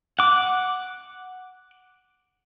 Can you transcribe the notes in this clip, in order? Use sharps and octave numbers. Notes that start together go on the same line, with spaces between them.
F#5 D6